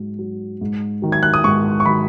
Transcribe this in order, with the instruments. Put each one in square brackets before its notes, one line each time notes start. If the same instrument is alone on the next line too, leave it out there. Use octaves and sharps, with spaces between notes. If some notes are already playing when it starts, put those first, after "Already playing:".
Already playing: [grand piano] G#2 F#3
F#3
G#2
D#3 F#3
G#6
F#6
D#6
G#2 C#6
C#6
D#3 F#3 B5